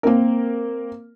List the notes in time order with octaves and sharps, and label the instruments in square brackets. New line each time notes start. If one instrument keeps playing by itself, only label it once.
[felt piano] A#3 C4 A#4